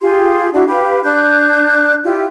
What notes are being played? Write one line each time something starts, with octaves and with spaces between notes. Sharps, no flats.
F4 G4 G#4 C6
D4 E4 F#4
G4 B4 F5 B5
D4 F#6 G6
E4 F4 G4